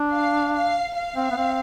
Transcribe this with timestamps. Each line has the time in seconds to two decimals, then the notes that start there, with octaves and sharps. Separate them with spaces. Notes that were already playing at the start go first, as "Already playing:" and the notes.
Already playing: D4
0.12 F5
0.54 F5
0.95 F5
1.16 C4
1.31 B3
1.37 C4